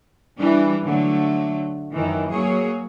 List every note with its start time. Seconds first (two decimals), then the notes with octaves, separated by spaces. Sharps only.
0.37 E3 G3 D4
0.83 D3 F#3 A3
1.93 F#2 D#3 E3
2.31 F#3 A#3 G#4 C#5